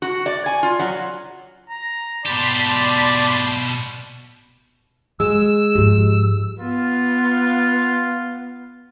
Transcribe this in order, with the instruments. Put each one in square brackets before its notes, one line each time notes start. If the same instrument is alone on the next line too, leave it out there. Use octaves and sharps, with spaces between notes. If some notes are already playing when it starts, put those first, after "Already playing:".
[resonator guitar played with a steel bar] F#4
D5
G#5
F4
F#3
[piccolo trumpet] A#5
[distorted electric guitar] B2 G4 [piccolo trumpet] D5 [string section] A5 B5 C6
[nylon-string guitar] G#3 [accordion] E6
[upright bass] G#2 F3 [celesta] G4
[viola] B3 [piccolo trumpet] F4